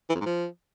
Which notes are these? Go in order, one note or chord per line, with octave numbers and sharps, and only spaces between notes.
E3
F2
G#2
F3